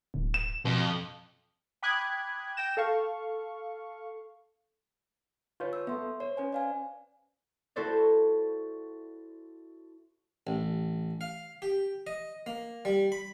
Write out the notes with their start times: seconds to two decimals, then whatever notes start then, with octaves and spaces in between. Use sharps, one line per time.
0.14 D1
0.34 E7
0.65 F2 B2
1.83 G5 B5 D6 D#6 F#6 G#6
2.57 G5 G6 A#6 E7
2.77 A4 F5 C#6
5.60 F4 B4 C#5 C#6 G6
5.73 E6
5.87 B3 A4 E5 C6
6.20 C5 C#5
6.37 C#4 B4 G#5
6.53 D5 F5 G#5
7.76 E4 F#4 A4 C5 D5
10.47 A1
11.21 F5
11.62 G4
12.07 D#5
12.46 A#3
12.85 G3
13.12 B5